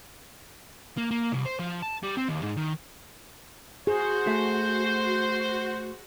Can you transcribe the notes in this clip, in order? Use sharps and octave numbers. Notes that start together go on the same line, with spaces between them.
A#3
A#3
C2
C5
F3
A5
G3
C4
D#2
G#2
D#3
F#4 G#4 C5
A3